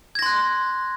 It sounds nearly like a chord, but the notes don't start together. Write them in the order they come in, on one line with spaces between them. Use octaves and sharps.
G#6 A#6 C6 F#6